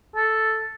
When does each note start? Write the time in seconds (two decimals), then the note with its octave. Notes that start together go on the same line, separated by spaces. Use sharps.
0.16 A4